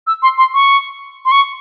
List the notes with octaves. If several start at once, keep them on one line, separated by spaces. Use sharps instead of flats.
E6
C6
C6
C#6
C6
C#6